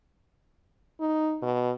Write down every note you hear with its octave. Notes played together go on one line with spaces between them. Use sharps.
D#4
B2